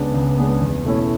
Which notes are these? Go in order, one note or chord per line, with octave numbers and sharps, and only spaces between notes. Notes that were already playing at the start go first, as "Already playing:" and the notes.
Already playing: C#2 C#3 G#3 B3 D4
C#2
C#3 G#3 B3 D4
E2
B2 A3 C#4 E4